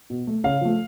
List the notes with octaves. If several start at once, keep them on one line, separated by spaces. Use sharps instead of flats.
B2
A3
C#3 F5
F3 A3